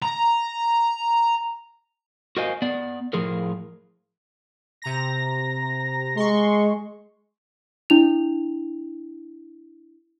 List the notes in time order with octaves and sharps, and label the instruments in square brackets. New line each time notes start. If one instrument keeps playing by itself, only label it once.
[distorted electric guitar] A#5
[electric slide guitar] F#4 A#4 C5 D#5 F5 G#5
B3 D5
A2 F3 G#4 A#4
[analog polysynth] C3 A#5 A#6
[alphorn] G#3 [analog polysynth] C6 C#6
[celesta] D4 E4 F7